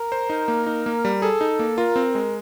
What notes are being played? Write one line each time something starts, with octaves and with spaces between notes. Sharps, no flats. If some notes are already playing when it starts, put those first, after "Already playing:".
Already playing: A#4
C5
D#4
A#3
D#4
A#3
G3
G#4 A4
D#4
A#3
F4 A#4
C4
G#3